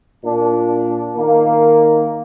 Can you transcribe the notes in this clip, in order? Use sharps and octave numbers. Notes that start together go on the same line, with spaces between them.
A#2 D4
D#3 A#3